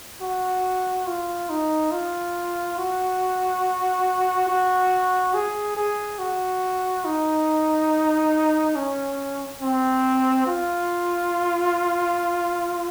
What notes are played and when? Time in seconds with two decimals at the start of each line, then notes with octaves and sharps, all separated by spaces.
0.21 F#4
1.07 F4
1.50 D#4
1.92 F4
2.78 F#4
4.48 F#4
5.34 G#4
5.77 G#4
6.19 F#4
7.05 D#4
8.76 C#4
9.61 C4
10.47 F4